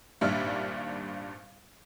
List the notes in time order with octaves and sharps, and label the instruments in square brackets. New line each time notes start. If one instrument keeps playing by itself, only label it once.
[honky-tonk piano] G#1 G2 A#2 G3 E5 F6